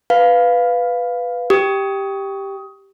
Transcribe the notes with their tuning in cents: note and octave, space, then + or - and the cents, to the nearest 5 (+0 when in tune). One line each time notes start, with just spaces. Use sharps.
B4 +5 F5 +0
G4 +0 D#6 +20